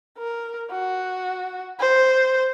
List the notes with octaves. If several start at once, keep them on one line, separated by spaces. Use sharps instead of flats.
A#4
F#4
C5